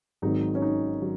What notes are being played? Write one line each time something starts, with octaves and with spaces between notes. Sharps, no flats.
G#1 G#2 D#3 F#3 D#4
C#4
D#4
D#3 F#3